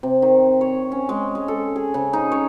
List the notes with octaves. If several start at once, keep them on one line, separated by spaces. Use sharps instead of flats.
C3
D#3
C#5
C#4
G#3
G#3
A4
G#4
C#3
D#4
C#5